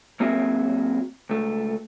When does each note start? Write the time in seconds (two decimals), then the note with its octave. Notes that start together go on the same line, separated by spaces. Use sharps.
0.20 F#2 A#3 C4 F#4 G#4 E5
1.30 C#2 A3